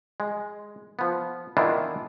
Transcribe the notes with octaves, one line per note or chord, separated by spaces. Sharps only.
G#3
F3 B3
D#3 E3 B3 D4 E4 F4